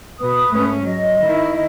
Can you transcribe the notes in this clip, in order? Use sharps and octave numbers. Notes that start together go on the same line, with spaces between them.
B2 B4 D#6
G#2 A3 C#4
F#3 D#5
D#3 E4